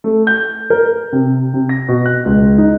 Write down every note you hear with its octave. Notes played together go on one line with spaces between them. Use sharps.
A3
G6
A#4
C3
C3
A#6
B2
F#6
C#2
D#4